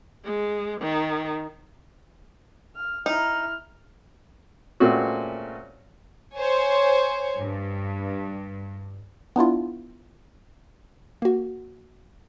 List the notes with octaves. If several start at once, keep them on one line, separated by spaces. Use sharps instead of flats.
G#3
D#3
F6
D#4 E4 F6
A#2 G#3 A3 C4 C#4 F#4
C5 C#5 G#5
G2
B3 D4 E4 F4
A#3 F#4